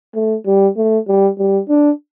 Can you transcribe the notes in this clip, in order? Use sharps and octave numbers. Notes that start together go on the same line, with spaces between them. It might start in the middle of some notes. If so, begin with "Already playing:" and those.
A3
G3
A3
G3
G3
D4